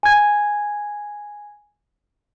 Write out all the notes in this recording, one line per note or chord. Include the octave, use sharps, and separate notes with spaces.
G#5 G#6